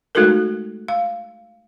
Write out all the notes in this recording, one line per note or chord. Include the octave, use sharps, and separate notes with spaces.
G#3 A3 D#4 F#4 A4 A#4
F5